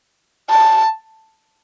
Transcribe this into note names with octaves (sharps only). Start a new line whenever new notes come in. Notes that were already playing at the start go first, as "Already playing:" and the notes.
A5